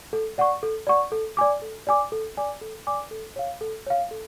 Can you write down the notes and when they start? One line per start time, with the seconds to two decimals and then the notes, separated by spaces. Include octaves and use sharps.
0.13 A4
0.38 D5 F#5 C#6
0.63 A4
0.87 D5 F#5 C#6
1.12 A4
1.37 D5 G#5 D6
1.62 A4
1.87 D5 G#5 D6
2.12 A4
2.37 D5 G#5 D6
2.61 A4
2.87 D5 G#5 D6
3.11 A4
3.36 C#5 F5
3.61 A4
3.86 C#5 F5
4.11 A4